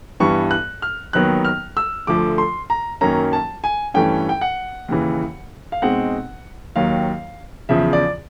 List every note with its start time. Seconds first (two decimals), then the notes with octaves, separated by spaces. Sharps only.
0.20 G2 E3 G3 B3 C#6
0.51 F#6
0.82 F6
1.13 D#2 D#3 F#3 B3 F#6
1.45 F6
1.77 E6
2.07 D2 D3 F3 A3 D6
2.38 C6
2.70 A#5
3.01 F#2 D#3 F#3 A#3 C#4 A#5
3.33 A5
3.64 G#5
3.94 G2 E3 A3 C#4 G5
4.29 G5
4.41 F#5
4.88 D#2 C#3 E3
5.72 F5
5.82 B2 G#3 C4 D#4 F#5
6.76 D#2 D#3 F#3 F5
7.69 E2 C#3 F3 E5
7.93 D5